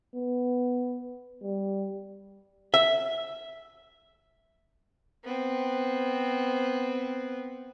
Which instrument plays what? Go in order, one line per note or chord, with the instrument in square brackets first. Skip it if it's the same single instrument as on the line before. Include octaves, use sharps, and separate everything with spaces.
[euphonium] B3
G3
[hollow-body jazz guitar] E5
[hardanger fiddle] B3 C4